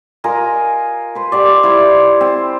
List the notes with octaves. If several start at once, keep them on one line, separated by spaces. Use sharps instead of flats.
F4 A#4 D#5 G#5
B4 C5
G4 C5 D5
E4 C5
C4